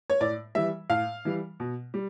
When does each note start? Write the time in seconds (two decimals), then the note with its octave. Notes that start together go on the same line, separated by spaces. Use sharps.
0.10 C#5
0.21 A2 D5
0.55 E3 G3 E5
0.90 A2 F5
1.25 E3 G3
1.60 B2
1.94 G3